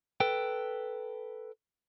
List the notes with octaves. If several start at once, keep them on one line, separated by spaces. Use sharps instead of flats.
A4 B4 G5